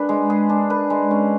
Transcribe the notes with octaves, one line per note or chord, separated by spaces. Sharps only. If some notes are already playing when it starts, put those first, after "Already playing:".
Already playing: D4 G#4 B4
G#3
G#4
D4
B4
G#3
C#4